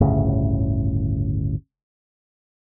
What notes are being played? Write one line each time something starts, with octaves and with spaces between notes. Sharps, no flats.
G1 D2 A2 C#3